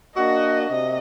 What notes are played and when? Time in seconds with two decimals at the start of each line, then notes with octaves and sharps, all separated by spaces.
0.16 A#3 D4 F#4 D#5
0.69 C3 D#5